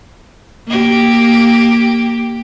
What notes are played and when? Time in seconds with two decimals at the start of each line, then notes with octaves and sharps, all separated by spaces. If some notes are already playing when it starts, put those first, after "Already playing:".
0.67 A#3 G4